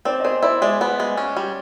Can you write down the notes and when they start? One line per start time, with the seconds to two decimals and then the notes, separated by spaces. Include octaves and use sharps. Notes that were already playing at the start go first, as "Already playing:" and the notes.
0.05 C4 C5 D5
0.20 D#5
0.24 G#4 C5 D5
0.43 E4 C5 D5
0.61 G#3 D5 E5
0.81 B3
1.00 G#3
1.17 C#4
1.36 G3